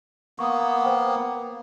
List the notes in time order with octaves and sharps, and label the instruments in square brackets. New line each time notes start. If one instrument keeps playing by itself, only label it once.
[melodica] A#3 B3 [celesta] C#6 D#6
[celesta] C5 G5